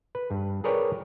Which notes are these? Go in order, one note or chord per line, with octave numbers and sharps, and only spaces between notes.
B4
G2
G#4 A#4 B4 C#5 D5 G5